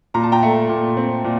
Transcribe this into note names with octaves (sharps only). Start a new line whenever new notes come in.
A#2 A#5
A5
G5 A#5
A3
A#2
C4
A#2